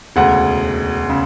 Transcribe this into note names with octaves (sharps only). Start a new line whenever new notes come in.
E1 D2 C#3 F#5
C#3